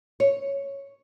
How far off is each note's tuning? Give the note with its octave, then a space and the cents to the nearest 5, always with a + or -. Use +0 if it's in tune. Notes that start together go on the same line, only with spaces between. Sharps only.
C#5 -5